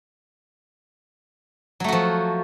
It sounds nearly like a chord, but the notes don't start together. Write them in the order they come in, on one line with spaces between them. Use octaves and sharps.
F#3 A3 F#4 F3